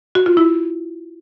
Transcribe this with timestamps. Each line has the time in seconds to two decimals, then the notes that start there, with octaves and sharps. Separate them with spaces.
0.15 F#4
0.26 F4
0.37 E4